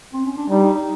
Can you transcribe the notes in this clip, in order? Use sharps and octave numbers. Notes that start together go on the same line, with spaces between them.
C4
C#4
D4
G3 D#4
D#4
D#4